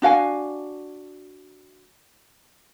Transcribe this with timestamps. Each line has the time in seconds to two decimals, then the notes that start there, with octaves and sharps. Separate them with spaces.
0.02 D4 F#4 F5 G#5